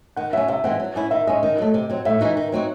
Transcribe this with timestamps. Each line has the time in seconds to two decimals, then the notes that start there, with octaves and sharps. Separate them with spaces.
0.16 D#3 F#5
0.33 F#3 C#4 E5
0.48 C3 E5
0.64 E3 G#3 C4 F#5
0.80 F#3
0.96 C#4 E4
1.11 D#3 E5
1.27 G#3 C#4 D#5
1.43 D#3
1.58 F#3 A3
1.74 C3
1.90 F#3 C4
2.05 A2 E5
2.21 E3 G#3 D#4 F#4
2.37 D#3
2.52 F#3 C4 D#4 F#4